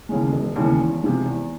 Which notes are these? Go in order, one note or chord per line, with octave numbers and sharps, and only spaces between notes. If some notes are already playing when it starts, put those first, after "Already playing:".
D#2 C#3 E3 G#3
E1
D#2 C#3 E3 G#3
E2
C3 F3 G#3
E2